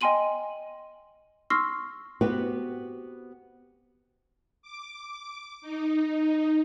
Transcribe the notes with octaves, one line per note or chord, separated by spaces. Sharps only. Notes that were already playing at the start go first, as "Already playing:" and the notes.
D#5 G5 G#5 C6 D#7 F#7
C6 C#6 E6 F6 A#6 C7
B3 C4 F#4 G4 B4
D6
D#4